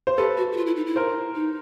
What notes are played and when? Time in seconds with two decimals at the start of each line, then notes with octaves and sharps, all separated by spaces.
0.07 C5
0.17 G4 A4 B4
0.37 F#4
0.52 F#4
0.57 F4
0.67 E4
0.76 D#4
0.86 E4
0.96 A#4 C5
1.35 D#4